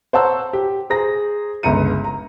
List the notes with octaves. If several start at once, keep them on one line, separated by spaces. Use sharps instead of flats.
C5 C#5 F#5 A5 A#5 E6
G4
G#4 C5 A#5 A#6
G1 C#2 E5 A#5 C#7 D#7
A#5